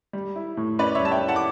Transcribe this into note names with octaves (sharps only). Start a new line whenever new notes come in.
G3
E4
A2
C#4 B4 D5
C#5 E5
G3 A5
E5 G5
E4
F#5 A5
D6